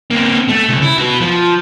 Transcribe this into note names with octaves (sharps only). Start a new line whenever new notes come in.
A#3 C4
A3
C2 C#3
E4
F#4 B4
F3